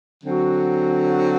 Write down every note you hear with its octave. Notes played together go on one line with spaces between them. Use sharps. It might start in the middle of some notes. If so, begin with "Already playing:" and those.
D3 F#3 C4 F#4